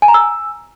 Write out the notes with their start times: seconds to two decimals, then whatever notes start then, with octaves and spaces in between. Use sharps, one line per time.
0.02 G#5
0.08 A#5
0.14 E6